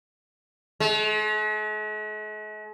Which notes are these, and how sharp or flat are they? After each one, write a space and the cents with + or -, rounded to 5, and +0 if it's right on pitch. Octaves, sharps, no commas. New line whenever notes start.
G#3 +45